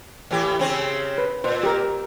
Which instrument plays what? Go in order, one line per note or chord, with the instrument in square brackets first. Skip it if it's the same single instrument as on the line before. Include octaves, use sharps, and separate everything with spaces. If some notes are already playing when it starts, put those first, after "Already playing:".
[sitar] A2 E3 G4
C#3 C4 C#4
[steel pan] B4
[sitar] A#2 [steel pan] C5
[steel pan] G4 A#4